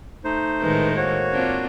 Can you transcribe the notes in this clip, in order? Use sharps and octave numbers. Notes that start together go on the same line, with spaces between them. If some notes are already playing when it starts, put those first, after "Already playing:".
A3 D#4 C5
A2 D#3 G#3 B4
A#3 F#4 C5 C#5
C4 D4 F4